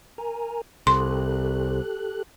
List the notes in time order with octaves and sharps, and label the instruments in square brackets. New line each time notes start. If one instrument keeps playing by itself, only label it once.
[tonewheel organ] A#4 G#5 A#5
[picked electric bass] C2 [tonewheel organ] G4 A4 F#6 [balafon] C6